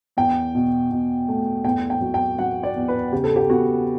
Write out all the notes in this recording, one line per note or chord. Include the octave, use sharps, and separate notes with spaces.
E2 G5
B2
B2
A3
E2 G5
G5
F#3
G5
F#3 F#5
D5
E2
B4
C#3 G4
A4
G4
B3 F#4